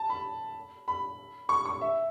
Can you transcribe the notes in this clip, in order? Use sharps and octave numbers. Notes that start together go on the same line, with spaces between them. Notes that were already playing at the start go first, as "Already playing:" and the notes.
Already playing: A5
B5
B5
C#6
C#6
E5